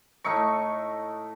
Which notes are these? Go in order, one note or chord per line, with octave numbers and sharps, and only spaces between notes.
A2 A3 D#4 C#6